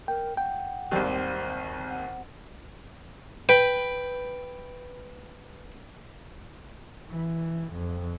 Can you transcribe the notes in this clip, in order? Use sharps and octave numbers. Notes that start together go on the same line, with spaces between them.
A#4 G5
F#5 G5
G#1 D#2 G3 C4
F#5
B4 G5
E3
F2